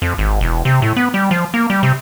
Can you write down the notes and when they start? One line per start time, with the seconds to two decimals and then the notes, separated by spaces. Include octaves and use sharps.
0.02 F2
0.18 G#1
0.41 E1
0.65 C3
0.82 A2
0.96 B3
1.14 G3
1.31 F3
1.54 A#3
1.70 G3
1.83 C3